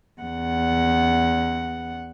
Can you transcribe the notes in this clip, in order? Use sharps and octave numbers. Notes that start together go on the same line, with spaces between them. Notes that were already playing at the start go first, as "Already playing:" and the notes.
E2 F#5